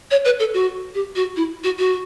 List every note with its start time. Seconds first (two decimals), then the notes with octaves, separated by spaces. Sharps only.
0.11 C#5
0.25 B4
0.39 A4
0.54 F#4
0.95 G4
1.16 F#4
1.36 E4
1.64 F#4
1.79 F#4